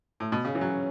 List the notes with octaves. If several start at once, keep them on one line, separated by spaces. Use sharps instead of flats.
A2
B2
C#3 C#4
E3
F#3